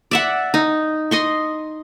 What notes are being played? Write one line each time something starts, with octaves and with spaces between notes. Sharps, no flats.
D5 E5 F#5
D#4
D#5 C6 C#6